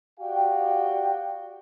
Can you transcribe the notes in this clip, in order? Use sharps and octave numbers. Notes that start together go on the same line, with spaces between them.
F#4 G4 D5 F5 G5